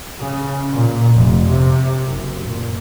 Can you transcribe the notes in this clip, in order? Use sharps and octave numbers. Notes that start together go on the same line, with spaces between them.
C#3
A#2
F1
C3
F#1
A#2